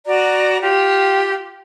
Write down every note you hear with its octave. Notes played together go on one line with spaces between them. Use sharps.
F#4 D5 A#5
F4 G4